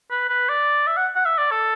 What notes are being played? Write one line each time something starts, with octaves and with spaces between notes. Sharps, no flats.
B4
B4
D5
E5
F#5
F#5
E5
D5
A4